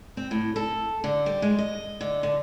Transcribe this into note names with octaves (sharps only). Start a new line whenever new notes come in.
C4
A2
A4
D3
G3
G#3
D#5
D3
D3